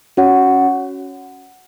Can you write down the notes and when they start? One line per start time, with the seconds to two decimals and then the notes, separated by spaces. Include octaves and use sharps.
0.17 C#4 F#4 C#5 F#5